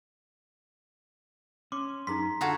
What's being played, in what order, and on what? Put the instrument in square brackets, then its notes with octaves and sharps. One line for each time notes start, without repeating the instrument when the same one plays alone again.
[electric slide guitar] C#4 [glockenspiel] C6 [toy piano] D6
[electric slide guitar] F#2 [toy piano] D#4 G#4 C6 [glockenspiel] A#5 B6
[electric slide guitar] D3 [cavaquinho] F4 F#4 A4 [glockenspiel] A#5 C#6 G#6